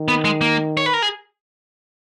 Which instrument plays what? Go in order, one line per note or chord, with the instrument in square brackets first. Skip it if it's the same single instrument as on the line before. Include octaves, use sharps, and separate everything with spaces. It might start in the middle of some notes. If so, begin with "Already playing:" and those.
Already playing: [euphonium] D#3
[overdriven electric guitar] B3
G#3
A#3
C#5
B4
A#4
G#4